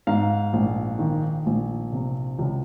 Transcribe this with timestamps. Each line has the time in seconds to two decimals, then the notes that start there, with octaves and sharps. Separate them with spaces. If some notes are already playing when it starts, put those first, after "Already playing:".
0.07 G#2 F5
0.53 A#1
0.99 D#3
1.46 A#1
1.93 C3
2.39 C#2